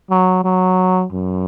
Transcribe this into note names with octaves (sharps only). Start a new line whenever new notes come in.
F#3
F#3
F#2